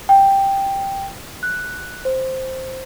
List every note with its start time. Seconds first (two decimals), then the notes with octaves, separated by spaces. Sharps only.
0.09 G5
1.43 F#6
2.05 C5